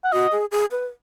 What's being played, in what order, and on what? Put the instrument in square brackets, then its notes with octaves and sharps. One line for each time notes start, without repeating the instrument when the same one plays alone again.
[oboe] F#5
[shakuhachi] F#4 [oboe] D#5
[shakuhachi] G#4
G#4
B4